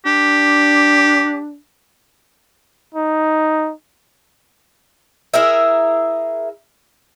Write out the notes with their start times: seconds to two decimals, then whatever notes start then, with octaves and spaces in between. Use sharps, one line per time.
0.06 D4 G4
2.94 D#4
5.34 E4 G#4 A#4 E5